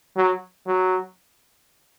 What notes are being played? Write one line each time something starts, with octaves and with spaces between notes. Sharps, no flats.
F#3
F#3